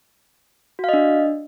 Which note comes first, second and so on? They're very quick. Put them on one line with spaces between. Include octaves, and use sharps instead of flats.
F#4 F5 D#5 D4